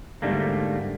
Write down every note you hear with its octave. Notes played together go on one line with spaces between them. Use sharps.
G#2 D3 G3 A3 A#3